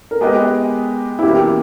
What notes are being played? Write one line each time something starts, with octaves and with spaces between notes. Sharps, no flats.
A#4
G#3 B3 G4 G#4 B4 D#5
E4
E2 B2 A#3 G4